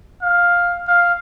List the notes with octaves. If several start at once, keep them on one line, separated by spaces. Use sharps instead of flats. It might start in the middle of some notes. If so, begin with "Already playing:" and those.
F5
F5